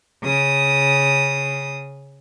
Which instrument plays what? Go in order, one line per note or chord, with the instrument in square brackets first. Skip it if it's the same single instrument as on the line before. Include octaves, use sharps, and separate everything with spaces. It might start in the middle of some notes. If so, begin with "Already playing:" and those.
[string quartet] C#3 D#6